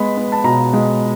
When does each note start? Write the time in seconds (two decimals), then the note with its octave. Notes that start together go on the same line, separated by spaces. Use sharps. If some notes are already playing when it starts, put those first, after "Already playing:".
Already playing: G#3 B3 B5
0.17 B3
0.32 A5
0.44 B2 A#5
0.73 G#3